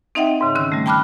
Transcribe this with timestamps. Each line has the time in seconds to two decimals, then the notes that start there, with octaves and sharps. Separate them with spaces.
0.15 C4 D#4 D#5 E5 F#5 G5
0.41 G#2 C#3
0.55 D3 D#3 C#4 E6
0.72 G3 A3
0.86 G5 A5 B5 D6 F6 F#6